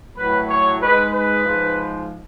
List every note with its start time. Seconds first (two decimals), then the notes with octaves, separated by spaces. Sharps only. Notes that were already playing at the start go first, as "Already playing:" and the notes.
0.17 A2 F#3 B4
0.49 C#5
0.81 G#2 G#3 B4
1.13 B4
1.46 G#2 F3 G#3